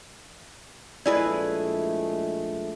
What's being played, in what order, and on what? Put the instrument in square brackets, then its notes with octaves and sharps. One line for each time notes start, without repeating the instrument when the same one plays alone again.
[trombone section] A#1 G#3 A3 [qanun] E4 G#4 B4 [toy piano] D5 D#5